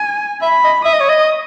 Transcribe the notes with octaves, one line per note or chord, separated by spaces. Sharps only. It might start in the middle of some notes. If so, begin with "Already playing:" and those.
Already playing: G#5
E5 B5
D#5
E5 D#6
D#5
C#5
D#5